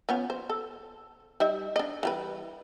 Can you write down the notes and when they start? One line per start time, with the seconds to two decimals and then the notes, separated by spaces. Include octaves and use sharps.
0.09 F3 B3 C#4
0.30 C5
0.49 A4
1.40 G3 D#4 E5
1.76 D4 D#5
2.03 E3 G3 B4